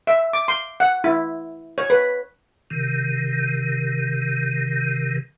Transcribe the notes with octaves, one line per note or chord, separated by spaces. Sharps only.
E5
D6
C6
F#5
E4
C#5
B4
C3 D#3